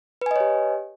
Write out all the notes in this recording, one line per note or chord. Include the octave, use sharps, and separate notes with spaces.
G4 B4 C#5 D#5 G#5